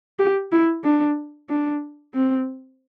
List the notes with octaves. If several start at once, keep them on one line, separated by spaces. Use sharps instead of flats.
G4
E4
D4
D4
C4